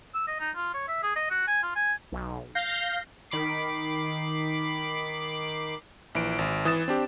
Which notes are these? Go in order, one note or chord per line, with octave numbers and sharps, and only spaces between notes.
E6
D#5
D#4
F4
C#5
E5
G#4
D#5
F#4
G#5
F4
G#5
B1
F5 G6 A#6 C7
D#3 B5 D6 C7
A#1 E3 D7
G#1
E3 D#6 A6 E7
C4 D4 G4